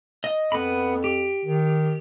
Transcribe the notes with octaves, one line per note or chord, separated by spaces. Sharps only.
D#5
F2 B3 B5
G4
D#3